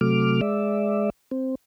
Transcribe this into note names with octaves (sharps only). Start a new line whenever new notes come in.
C3 F#3 A3 D6 F6
G#3 D5 E5
C4